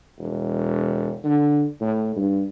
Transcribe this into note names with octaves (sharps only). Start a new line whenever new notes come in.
E1
D3
A2
G2